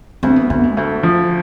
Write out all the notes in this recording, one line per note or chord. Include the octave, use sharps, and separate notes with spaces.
D2 C4
B3
D2 B3
G#3
D2 A3
F3